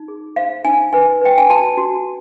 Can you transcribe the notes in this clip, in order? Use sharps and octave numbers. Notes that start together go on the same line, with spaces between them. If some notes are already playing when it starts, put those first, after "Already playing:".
Already playing: D#4
G#4
C5 F5
D#4 G#5
B4 G#5
B4 G5
G#5
F#4 A5
F#4